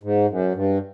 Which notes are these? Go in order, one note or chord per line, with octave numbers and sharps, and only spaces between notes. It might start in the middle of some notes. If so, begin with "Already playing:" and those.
G#2
F#2
G2